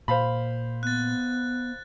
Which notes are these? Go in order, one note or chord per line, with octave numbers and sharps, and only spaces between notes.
A#2 C5 F5 B5
B3 F#6 A6